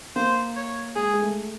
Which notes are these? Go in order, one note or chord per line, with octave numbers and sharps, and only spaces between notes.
A#3 C5
C#5
G#3 G#4
G#3
A3